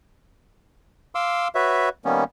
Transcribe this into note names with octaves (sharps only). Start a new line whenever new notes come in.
F5 C6 D6 E6
F#4 B4 C#5 E5
D#3 G3 A#3 B3 C#4